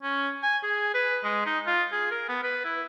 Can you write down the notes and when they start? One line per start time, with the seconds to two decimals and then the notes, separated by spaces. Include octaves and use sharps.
0.03 C#4
0.43 G#5
0.63 G#4
0.95 B4
1.24 G#3
1.46 D#4
1.67 F4
1.92 G#4
2.11 A#4
2.29 B3
2.43 B4
2.65 E4